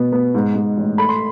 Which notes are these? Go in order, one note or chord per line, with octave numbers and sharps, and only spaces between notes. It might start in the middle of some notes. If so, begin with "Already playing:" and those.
Already playing: B2 B3
B3
G#2
G#2
A1
A3 B5
C6